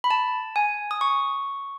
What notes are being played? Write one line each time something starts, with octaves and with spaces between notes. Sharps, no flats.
B5
A5
G#5
D#6
C#6